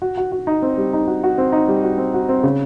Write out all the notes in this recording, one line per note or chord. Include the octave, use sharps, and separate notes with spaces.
F#4
F#4
F#4
D#4
C4
G3
D#4
F#4
F#4
C4
D#4
G3
F#4
C4
F#4
C4
C#3